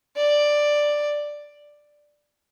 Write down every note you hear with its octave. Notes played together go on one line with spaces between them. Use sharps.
D5